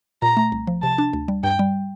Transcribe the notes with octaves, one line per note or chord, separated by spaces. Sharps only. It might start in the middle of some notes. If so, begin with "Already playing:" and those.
A#2 A#5
A3
C2
F3
C3 A5
D4
D2
G3
G2 G5
G3